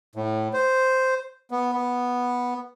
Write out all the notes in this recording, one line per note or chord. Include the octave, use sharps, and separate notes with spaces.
A2
C5
B3
B3